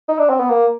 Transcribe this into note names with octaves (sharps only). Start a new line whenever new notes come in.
D#4
D4
C4
B3
A#3